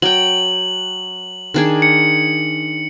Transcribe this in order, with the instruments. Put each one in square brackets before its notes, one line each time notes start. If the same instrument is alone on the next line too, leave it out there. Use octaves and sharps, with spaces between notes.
[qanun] F#3 G5 [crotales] F#7
[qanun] D#3 D4 G#4
[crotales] C#7